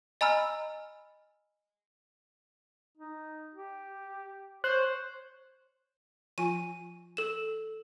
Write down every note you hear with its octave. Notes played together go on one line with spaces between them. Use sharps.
D#5 G#5 A#5 B5 E6 F6
D#4
G4
C5 C#5 F#6
F3 F4 G#5 D#7
A4 E7